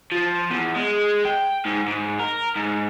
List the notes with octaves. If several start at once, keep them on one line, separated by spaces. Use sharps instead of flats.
F3
E2
G#3
G5
G#2
G#2
A#4
G#2